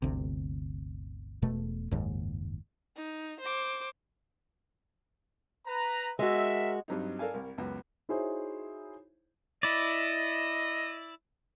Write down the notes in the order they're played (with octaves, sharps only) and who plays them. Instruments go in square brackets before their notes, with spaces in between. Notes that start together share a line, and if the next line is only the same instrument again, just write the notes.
[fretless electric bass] G1 D2 C3
E1 B2 A3
F#1 D#2 G#2
[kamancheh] D#4
C5 D6
[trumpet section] B4 A#5
[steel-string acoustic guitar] G#3 F#4 [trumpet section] A#4 E5
[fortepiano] G2 F#3 C4 D#4
A4 A#4 D5 F5 G#5
C2 A#4
C#2 F#2 B3
[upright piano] D#4 E4 F#4 G#4 C5 C#5
[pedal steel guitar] E4 D5 [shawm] D#5